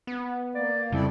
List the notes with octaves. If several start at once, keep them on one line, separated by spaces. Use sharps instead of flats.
B3
A#3 D5
F2 C#3 G3 C4 E4 A4 D5